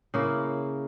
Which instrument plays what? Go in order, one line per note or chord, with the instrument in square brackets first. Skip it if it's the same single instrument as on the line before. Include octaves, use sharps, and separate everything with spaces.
[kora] C#3 A#3 E4